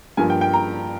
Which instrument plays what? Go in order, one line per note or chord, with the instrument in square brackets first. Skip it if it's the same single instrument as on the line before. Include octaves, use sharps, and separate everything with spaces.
[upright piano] G2 F3 A#3 G#5
G5
G5
A#5